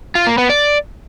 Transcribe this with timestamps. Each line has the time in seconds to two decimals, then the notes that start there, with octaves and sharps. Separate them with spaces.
0.15 F4
0.27 A#3
0.38 B3
0.49 D5